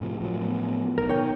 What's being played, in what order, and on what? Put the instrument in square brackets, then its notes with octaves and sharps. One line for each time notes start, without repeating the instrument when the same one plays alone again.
[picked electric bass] A2 C3 F3
A2 F3 F#3
[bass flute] B3
[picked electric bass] B1 [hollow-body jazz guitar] A#4
[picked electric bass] D#3 [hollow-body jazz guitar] C#5 G5